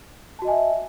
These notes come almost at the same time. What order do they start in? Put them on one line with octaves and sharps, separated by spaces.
A5 F#4 D#5 G#5 E5